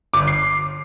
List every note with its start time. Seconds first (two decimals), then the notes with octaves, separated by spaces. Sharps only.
0.13 G1 D6
0.27 C7